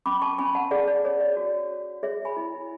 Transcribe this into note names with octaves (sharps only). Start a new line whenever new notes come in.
C#4 B5 D6
A5 C#6
C#4 G#5 B5
F#5 A5
G#4 D5 F#5
D5
G#4 C#5
D5
F#4
C#5
G#4 C#5 E5
G#5 B5
E4